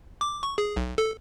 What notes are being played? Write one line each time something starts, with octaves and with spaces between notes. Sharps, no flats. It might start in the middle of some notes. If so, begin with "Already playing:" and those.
D6
C#6
G#4
B1
A4